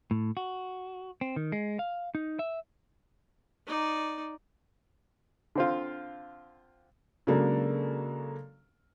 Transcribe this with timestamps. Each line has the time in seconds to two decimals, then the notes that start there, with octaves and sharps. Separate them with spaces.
0.11 A2
0.37 F#4
1.21 C4
1.36 D#3
1.52 G#3
1.79 F5
2.15 D#4
2.39 E5
3.67 D#4 D5
5.55 D3 C4 F4
7.27 C#3 F#3 G#3 A#3 D4 A4